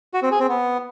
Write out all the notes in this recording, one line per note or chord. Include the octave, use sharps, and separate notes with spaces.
F#4
C4
G#4
C4
B3